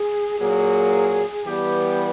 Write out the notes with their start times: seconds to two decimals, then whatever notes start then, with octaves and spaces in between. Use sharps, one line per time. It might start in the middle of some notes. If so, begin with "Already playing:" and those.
Already playing: G#4
0.39 A#2 F#3 A#3 G#4
1.45 E3 G3 B3 G4